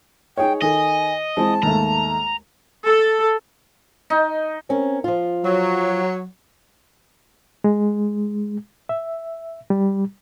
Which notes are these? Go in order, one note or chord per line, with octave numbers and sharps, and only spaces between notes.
D#4 G#4 C#5 G5
D#3 A4 D#5 G#5
E3 G#3 C4 A5
D#2 G#2 A3 A#5
A4
D#4
C4 C#4 A#4
F3 F4
F#3
G#3
E5
G3